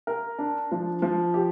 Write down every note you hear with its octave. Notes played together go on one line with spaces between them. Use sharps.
A#4
D4
F3
F3
G4